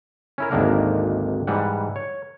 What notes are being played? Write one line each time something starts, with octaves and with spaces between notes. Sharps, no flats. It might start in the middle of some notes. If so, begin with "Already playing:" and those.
C#4 E4 A#4
G#1 D2 D#3 A#3 D4 A#4
G#2 E3 G3 F#5
C#5